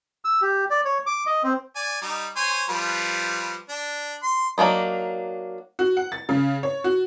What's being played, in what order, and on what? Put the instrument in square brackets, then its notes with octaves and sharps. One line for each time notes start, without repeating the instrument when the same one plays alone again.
[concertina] E6
G4
D5
C#5
D6
D#5
C4
[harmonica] D5 G#5
G3 D#4
C5 C#5 G#5
F3 G3 B4
D4
C6
[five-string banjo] F#3 A#3 D4 D#4
[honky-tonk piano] F#4
F#5
A6
C#3
C#5
F#4